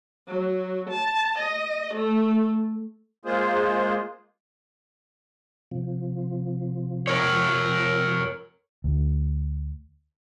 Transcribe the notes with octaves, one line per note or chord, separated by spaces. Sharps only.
F#3
A5
D#5
A3
G#3 A#3 F4 G#4 C5
C3 F3
A#4 C#5
D2